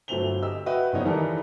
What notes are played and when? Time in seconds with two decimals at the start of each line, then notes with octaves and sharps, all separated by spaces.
0.08 G1 F#3 A3 C4 F7 G7
0.42 G4 D#5 E6
0.66 F#4 B4 D#5 E5 G5
0.93 F#1 F3 B3 D#4 C#5
1.05 D#3 E3 G3 D#4 A4 A#4